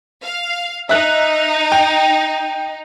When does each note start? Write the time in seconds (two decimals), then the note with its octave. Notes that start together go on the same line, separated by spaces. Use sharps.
0.22 F5
0.89 D#4 E5 F#6
1.72 G5